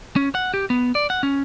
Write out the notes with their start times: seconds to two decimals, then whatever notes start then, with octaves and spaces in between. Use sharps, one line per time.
0.16 C#4
0.35 F#5
0.54 G4
0.70 B3
0.95 D5
1.10 F#5
1.23 C#4